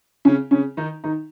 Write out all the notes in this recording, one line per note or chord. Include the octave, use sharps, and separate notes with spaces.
C#3 C#4
C#3 C#4
D#3 D#4
D#3 D#4